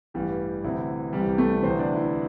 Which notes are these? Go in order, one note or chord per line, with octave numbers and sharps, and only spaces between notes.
A1 G2 E3 G3 G4
D2 C3 E3 E4
C2 C3 E3 G3 G4
A3 A4
D2 C3 E3 C4 C5
D4 D5
E4